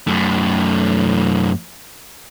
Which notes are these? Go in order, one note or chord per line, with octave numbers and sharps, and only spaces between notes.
F#2 A3